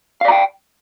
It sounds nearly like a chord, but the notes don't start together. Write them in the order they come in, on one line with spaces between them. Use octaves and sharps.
F5 D5 A#5 G5